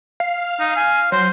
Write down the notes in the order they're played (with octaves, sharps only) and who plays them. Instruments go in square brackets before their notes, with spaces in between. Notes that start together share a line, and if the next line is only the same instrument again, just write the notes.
[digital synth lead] F5
[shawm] D#4
[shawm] F5 [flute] G#5
[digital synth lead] F#3 [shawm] C5 [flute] C6